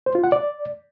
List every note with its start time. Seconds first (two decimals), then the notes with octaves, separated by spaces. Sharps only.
0.06 C5
0.15 F4
0.24 F#5
0.32 D5